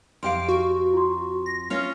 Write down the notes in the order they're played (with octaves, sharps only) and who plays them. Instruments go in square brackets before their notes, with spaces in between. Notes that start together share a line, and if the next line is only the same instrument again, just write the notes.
[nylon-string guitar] F2 G4 F5 [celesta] C6 [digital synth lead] D7
[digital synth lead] F#4
[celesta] F4 C6
[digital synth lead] A#6
[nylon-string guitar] C#4 F4 C#5